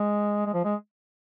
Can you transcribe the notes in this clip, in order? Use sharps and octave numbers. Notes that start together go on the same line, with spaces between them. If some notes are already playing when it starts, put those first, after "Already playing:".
Already playing: G#3
G#3
F3
G#3